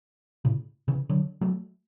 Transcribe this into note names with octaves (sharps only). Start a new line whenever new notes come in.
A2 C#3
C#3 E3
D3 F#3
F#3 A3